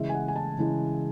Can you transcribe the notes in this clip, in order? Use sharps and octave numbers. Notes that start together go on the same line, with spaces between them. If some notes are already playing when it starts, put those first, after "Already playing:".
Already playing: C#3 E3 G#3 E5
G#5
F#5
G#5
A5
C#3 E3 G#3